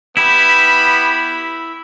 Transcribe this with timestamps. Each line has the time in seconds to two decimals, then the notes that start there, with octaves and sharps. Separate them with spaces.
0.17 B3 E4 G4 B5